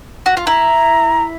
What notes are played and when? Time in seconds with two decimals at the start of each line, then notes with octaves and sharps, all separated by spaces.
0.26 F#4
0.37 F4
0.47 E4 A#5